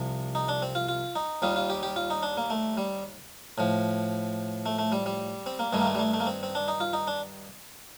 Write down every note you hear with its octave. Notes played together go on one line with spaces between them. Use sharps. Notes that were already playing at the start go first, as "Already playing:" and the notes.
Already playing: C2 C3 F3
D#4
D4
C4
F4
F4
D#4
D#2 D#3 G3 F4
F4
G4
G4
F4
D#4
D4
A#3
A3
G3
A2 F3
A3
A3
G3
G3
C4
A#3
G2 D#3 G3 A3
A#3
A3
G3
A3
A3
A#3
C4
C4
D4
D#4
F4
D#4
D4